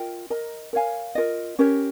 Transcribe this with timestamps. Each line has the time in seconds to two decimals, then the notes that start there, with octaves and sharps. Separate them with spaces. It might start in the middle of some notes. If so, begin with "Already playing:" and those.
Already playing: F4 A#4 D#5 G5
0.30 A#4 D#5 A#5
0.73 A#4 C#5 F5 G#5
1.15 F4 A#4 D#5
1.59 C#4 G4 A#4 C#5